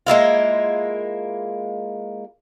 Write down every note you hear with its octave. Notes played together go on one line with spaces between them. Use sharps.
G#3 A#3 E4 F4